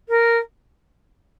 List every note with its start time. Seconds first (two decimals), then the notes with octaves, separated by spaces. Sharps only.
0.08 A#4